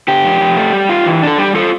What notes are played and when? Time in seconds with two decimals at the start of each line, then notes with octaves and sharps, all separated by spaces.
0.08 D3 G4
0.24 F2
0.41 F2
0.57 A3
0.73 G3
0.89 F4
1.06 E3
1.23 D4 A4
1.38 G3 G4
1.54 F4 A4